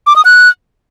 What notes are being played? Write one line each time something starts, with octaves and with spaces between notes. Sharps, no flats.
D6
D#6
F#6